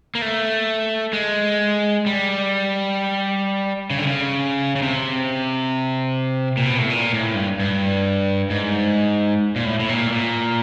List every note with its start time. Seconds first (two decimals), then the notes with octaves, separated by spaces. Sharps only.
0.15 A#3
0.22 A3
1.13 G#3
2.06 G3
3.90 C#3
3.99 D3
4.07 C#3
4.76 C#3
4.82 C3
6.57 A#2
6.66 B2
6.78 A2
6.90 A#2
7.13 A2
7.35 G2
7.60 G2
8.50 G#2
9.56 A#2
9.65 A2
9.80 A2
9.89 A#2
10.07 A2
10.12 A#2